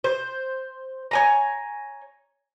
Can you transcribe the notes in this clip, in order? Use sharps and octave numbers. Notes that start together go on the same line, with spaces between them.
C5
C#5 G#5 A#5